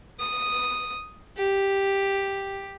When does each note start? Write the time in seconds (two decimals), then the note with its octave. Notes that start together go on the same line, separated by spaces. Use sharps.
0.20 D#6
1.37 G4